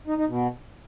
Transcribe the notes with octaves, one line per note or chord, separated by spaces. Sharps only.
D#4
D#4
B2